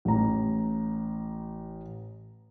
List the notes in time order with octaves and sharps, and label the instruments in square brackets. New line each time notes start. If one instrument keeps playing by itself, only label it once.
[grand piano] A1 A#5